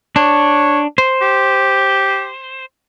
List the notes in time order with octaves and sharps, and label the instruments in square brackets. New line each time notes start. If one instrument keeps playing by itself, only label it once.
[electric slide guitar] D4 [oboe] C#5
[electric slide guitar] C5
[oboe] G4